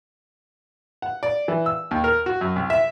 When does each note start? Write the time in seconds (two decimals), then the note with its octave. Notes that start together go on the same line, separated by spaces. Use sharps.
1.02 F#5
1.23 D5
1.48 E3
1.66 E6
1.91 D#2
2.04 A#4
2.26 F#4
2.41 F#2
2.56 C2
2.70 E5